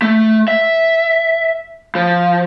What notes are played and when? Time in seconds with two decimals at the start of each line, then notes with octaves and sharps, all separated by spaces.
0.02 A3
0.48 E5
1.95 F3